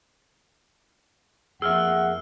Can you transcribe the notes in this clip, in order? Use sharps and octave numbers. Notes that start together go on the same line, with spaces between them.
F2 A#3 G#4 E5 F#5 E6 F6